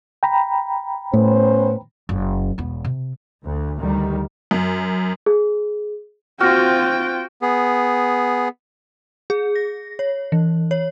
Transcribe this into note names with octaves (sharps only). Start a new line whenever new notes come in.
G5 A#5 B5
A2 B3 C#4 C5
F#1
E1 B3
C3
D2
D2 D#3 G3
F#2
G#4
C4 F4 F#4 G5 F6 A#6
B3 G#4
G#4
A#6
C#5
E3
C#5